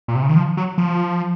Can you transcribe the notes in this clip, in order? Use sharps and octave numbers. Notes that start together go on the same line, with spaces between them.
A#2
C3
C#3
D#3
F3
F#3
F3